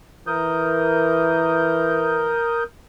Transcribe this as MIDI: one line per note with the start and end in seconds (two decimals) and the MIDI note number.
0.27 2.43 52
0.27 2.63 70
0.27 2.63 87
0.27 2.63 91